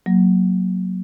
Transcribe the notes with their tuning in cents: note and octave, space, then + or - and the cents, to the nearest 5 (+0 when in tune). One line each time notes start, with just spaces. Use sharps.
F#3 +0 A#3 +0